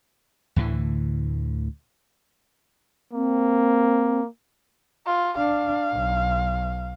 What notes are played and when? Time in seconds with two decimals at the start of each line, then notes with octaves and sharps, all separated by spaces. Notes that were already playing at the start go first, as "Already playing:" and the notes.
0.56 D2 A2 D3 E3
3.13 A#3 C4
5.07 F4
5.38 D4 F5
5.93 B1